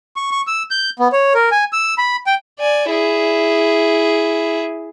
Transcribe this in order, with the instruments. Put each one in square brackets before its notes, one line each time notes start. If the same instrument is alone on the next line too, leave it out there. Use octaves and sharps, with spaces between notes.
[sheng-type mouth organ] C#6
C#6
E6
G6
B3
C#5
A#4
G#5
E6
B5
G5
[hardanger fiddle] D5 G#5
E4 G#4